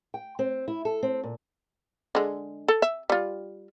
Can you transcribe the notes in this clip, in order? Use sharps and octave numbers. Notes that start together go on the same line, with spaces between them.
G5
C4
E4
A4
C4
A#2
D3 G#3
A4
E5
G3 F4